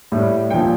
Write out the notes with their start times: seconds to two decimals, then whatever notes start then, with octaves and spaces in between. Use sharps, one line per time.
0.12 A2 G3
0.50 A#2 F3 G5